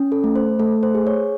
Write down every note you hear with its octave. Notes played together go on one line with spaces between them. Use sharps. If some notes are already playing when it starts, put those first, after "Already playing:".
Already playing: C#4
A4
A3
C5
A3 A4
C5
G#4
C#5